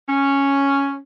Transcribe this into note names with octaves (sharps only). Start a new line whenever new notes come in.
C#4